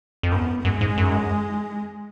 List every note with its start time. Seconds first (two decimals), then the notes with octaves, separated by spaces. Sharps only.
0.23 F2
0.32 F#2 B3
0.64 F#2 G#3
0.81 G#2
0.98 F#2